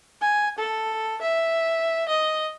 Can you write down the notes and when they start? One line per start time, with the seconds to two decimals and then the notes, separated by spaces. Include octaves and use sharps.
0.21 G#5
0.58 A4
1.21 E5
2.08 D#5